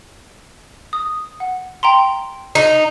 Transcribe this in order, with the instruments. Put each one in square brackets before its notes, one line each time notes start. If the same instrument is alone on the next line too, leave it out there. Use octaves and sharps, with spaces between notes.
[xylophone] D#6
F#5
G5 A#5 C6
[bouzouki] D#4